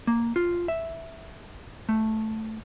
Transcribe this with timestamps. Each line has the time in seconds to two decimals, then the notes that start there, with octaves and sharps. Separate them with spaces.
0.07 A#3
0.36 F4
0.68 E5
1.89 A3